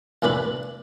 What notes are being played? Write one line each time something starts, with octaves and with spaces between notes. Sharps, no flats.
C2 F2 A2 D4 B4 B5